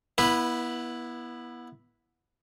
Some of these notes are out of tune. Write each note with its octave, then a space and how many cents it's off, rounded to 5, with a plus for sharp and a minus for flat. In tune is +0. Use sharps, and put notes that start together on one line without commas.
B3 -25 E4 +0 B4 +0